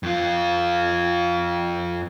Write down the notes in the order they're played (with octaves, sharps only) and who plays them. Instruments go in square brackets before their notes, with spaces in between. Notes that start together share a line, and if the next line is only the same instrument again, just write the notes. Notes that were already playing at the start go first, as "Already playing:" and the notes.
[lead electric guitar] F2 F4